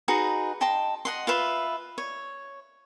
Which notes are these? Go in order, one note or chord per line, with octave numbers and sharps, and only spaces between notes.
D#4 F#4 G#4 B4
D#5 G5 A5 C6
D#5 F#5 C6
F4 B4 E5 C6
C#5